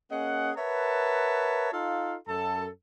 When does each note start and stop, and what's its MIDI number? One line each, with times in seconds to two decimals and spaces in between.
0.11 0.51 58
0.11 0.51 61
0.11 0.51 68
0.11 0.51 75
0.11 0.51 78
0.57 1.72 70
0.57 1.72 71
0.57 1.72 73
0.57 1.72 76
0.57 1.72 78
0.57 1.72 81
1.72 2.15 63
1.72 2.15 65
1.72 2.15 69
1.72 2.15 77
2.28 2.67 42
2.28 2.67 69
2.28 2.67 81